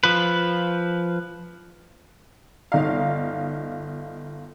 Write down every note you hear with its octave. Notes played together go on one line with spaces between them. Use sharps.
F3 B4
G1 D#4 D5 F5